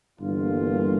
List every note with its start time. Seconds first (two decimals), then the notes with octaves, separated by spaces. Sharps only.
0.19 G1 G2 E3 A#3 F4